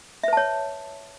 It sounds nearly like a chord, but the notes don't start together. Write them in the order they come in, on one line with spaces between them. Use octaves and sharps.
E5 B4 A5 C#5